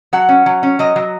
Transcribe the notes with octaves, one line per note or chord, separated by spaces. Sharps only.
F#3 F#5
C#4
F#3
C#4
F#3 D#5
F#3